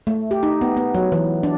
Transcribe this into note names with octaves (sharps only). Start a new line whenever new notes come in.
A3
G4
D#4
B3
B3
F#3
E3
D4